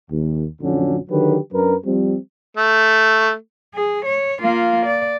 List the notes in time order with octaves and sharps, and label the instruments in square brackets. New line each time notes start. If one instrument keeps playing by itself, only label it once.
[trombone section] D#2
A1 F2 D3 F#3 C#4
D3 D#3 F#3 G4 B4
F#2 F#3 D4 A#4 B4
F3 G3 C4
[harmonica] A3
[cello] G#4
C#5
A#3 F4
D5